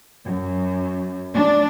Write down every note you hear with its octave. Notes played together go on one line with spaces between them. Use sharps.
F#2
D4